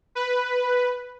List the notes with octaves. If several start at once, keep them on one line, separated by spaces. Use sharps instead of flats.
B4